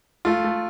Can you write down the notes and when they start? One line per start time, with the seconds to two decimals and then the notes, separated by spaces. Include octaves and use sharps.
0.25 A3 F4
0.44 A3